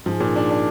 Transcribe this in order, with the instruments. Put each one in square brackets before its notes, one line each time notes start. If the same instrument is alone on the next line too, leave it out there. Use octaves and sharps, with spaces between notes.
[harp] G#2 [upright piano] F3
[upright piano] A#2
D4
D4